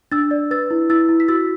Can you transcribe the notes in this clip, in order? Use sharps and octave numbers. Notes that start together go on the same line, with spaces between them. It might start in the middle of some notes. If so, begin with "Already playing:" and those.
D4 E6 A6
D5
B4 E6 A6
E4
E4 E6 A6
E4
B6
F#4 E6 A6